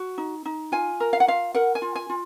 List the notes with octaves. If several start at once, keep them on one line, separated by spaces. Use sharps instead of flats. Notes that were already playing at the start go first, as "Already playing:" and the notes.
Already playing: F#4
D#4
D#4
F4 G#5
A#4
F5
F#5
F4 F5
A#4 F#5
G#5
F4
G#5
F4